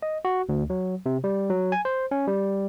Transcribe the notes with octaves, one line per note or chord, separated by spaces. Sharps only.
D#5
F#4
D2
F#3
C3
G3
F#3
G#5
C5
C#4
G3